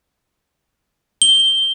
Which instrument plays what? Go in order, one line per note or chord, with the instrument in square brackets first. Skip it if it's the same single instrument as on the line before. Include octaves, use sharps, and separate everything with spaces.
[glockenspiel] G7